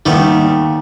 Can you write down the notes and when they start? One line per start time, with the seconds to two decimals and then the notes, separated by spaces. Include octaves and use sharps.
0.06 D#2 G3 A3 B3